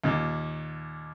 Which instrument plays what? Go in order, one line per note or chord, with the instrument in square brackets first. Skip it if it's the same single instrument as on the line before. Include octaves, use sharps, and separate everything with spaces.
[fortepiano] D#2 A#2